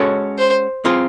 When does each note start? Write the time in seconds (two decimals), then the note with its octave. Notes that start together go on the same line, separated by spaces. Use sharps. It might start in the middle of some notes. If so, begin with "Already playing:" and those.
Already playing: G#3 C#4 F#4 A4 C#5
0.38 C5
0.85 C4 F4 G#4